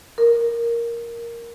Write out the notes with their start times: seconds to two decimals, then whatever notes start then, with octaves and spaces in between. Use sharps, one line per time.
0.18 A#4